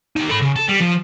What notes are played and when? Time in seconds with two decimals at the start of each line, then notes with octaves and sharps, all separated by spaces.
0.16 D#2 D#4
0.29 A4 B5
0.42 C#3
0.56 A4
0.69 G3
0.81 F3 C5